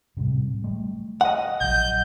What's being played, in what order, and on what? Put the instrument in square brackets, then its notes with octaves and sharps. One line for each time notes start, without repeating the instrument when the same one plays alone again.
[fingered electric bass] A2 C3 G3
G3 A3
[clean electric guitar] D#5 F#5
[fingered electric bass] A#1 F#3 [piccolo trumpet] G6